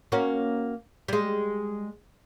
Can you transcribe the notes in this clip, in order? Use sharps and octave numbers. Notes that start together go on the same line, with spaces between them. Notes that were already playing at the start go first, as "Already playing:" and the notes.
A#3 C#4 F#4
G3 G#3